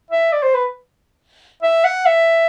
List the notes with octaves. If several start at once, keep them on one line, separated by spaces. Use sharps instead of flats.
E5
D5
C5
B4
E5
F#5
E5